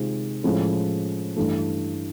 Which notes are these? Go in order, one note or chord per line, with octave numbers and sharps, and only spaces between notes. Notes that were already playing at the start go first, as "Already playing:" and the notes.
Already playing: C3 D#3 G#3 C4 F4
A2 F3 G#3 C#4 E4
G2 E3 A3